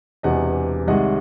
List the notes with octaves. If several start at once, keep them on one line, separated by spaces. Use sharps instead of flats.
E1 E2 C3 E3 D#5 F#5
C2 C3 D#3 G#3 D#5 F#5